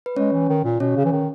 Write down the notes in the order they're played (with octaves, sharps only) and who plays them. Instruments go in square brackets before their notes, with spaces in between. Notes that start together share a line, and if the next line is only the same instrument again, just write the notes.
[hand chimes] B4
[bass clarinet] G#3 [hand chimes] C#4 C#5
[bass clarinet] E3
D#3
A#2
[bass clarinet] B2 [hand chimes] C#4 C#5
[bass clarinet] C#3
E3
D#3